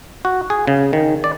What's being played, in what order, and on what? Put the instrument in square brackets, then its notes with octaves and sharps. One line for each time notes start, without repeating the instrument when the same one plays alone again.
[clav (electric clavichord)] F#4
G#4
C#3
D#3
D5